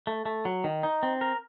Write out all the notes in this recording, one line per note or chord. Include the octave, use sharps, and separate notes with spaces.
A3
A3
F#3
D#3
D#4
C4
A#4